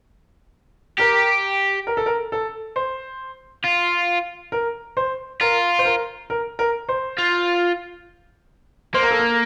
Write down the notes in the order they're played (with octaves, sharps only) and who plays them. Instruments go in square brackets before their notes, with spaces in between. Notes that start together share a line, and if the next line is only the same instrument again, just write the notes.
[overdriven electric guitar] G4 [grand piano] A#4
[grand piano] A#4
A4
A#4
A4
C5
[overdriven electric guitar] F4
[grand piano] A#4
C5
[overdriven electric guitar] F4 [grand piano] A#4
[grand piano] C5
A#4
A#4
A#4
C5
[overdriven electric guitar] F4
[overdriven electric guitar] A#3 [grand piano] C5
[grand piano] A#4
A4
A#4